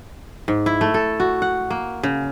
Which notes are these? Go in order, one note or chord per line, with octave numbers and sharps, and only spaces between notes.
G#2
E4
A3
A4
F#4
F#5
A#3
C#3